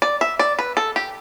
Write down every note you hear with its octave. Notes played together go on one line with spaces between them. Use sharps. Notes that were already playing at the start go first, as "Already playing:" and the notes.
D5
E5
D5
B4
A4
G4